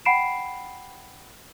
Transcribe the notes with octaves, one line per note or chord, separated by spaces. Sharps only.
F#5 G5 B5 C7 D7 E7